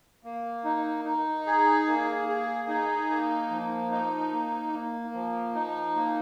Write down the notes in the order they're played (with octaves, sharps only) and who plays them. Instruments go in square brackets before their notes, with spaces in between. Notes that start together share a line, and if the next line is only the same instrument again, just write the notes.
[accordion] A#3
D#4
D#4
G#4
A#3
G#4
D#4
A#3
F3
D#4
A#3
A#3
F3
D#4
A#3